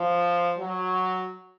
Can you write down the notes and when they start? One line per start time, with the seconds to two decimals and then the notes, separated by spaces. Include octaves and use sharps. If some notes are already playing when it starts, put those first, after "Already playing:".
Already playing: F3
0.58 F#3